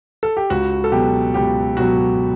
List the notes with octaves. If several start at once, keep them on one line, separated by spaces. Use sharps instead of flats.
A4
G4
C#2 F#4
A4
B2 F#3 G4
C#2 G4
B2 F#3 F#4